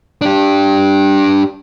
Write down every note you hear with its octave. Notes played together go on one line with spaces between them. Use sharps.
D4 G4